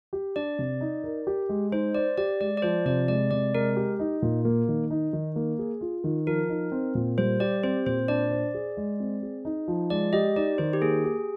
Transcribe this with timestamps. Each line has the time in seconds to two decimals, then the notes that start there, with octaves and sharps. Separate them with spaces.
0.13 G4
0.36 D4 D5
0.59 C3
0.81 D#4
1.04 A#4
1.27 G4
1.49 G#3
1.72 D#4 C5
1.95 C5 D5
2.17 G4 D5
2.40 G#3 D5
2.57 D5
2.62 F3 C5
2.85 C3 D5
3.08 G#3 D5
3.31 C3 D5
3.54 G#3 A#4
3.76 G4
3.99 D#4
4.22 A#2
4.45 A#3
4.68 D#3
4.90 D#4
5.13 D#3
5.36 A#3
5.59 G#4
5.81 F4
6.04 D#3
6.27 F3 A#4
6.49 D#4
6.72 C4
6.95 A#2
7.18 G3 C5
7.40 G4 D5
7.63 C4 C5
7.86 A#2 C5
8.08 D4 D5
8.31 C5
8.54 G#4
8.77 G#3
9.00 C4
9.22 G#4
9.45 D#4
9.68 F3
9.90 G#3 D5
10.13 G4 D#5
10.36 D#4 D5
10.58 D#3 C5
10.73 G4
10.81 A#3 G#4
11.04 G4